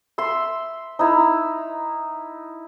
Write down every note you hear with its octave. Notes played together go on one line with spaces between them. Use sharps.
E5 C6
D#4 E4 A#5